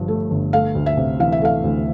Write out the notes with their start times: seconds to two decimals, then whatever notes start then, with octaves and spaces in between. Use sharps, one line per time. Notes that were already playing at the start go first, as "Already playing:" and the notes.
Already playing: G1 G2 F3
0.08 A3
0.31 G1
0.53 A3 F5
0.75 D2
0.86 E5
0.97 C3
1.20 E3 F5
1.32 E5
1.41 A3 F5
1.64 D2